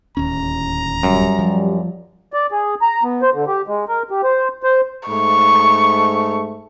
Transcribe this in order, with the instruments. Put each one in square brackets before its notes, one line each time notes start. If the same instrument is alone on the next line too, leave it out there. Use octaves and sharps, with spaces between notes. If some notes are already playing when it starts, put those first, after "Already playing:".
[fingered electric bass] D1 D#2 C#4 [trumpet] A#5
[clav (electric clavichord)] F#2 [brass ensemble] G3
[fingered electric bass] F3
[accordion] D5
G#4
A#5
B3
C5
D3
G4
G#3
A#4
G4
C5
C5
[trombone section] G#2 A3 [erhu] C#6